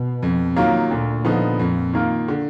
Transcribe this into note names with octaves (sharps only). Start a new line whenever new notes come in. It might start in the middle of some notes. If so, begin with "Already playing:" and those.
Already playing: B2
F2
D#3 F#3 A#3 F4
D2 A#2
D3 F3 B3 D#4
F2
D#3 A#3 F4
D3